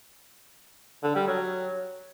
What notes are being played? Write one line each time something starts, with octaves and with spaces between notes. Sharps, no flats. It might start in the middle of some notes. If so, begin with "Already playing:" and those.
D3
G3
F#3